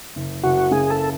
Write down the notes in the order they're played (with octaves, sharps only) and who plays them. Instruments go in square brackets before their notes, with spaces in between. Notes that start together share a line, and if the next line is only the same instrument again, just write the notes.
[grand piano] F#1
[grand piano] F#1 [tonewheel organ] F#4
[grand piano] C#3 [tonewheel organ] G#4
[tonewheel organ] A4